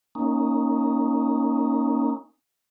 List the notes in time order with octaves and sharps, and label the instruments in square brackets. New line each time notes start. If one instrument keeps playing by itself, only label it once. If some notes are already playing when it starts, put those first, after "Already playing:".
[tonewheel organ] A#3 C#4 D#4